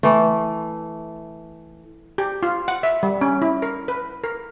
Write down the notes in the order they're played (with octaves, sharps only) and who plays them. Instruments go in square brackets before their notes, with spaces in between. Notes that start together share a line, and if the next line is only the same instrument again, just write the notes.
[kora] E3 A3
[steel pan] G4
F4
F#5
E5
G3
C#4
E4
A#4
B4
A#4